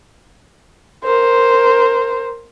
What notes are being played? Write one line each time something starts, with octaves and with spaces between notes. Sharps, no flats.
A#4 C5